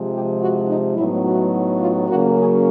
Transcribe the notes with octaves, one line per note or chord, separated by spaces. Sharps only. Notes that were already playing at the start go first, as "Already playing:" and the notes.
Already playing: C3 F3 G#3
G4
F#4
D#4
A2 F#3 B3 D#4 E4
F#4
F4
C#3 F#3 A#3 C#4 F#4
G#4